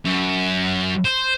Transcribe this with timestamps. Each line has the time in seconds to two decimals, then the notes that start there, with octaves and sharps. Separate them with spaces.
0.06 F#2
1.05 C5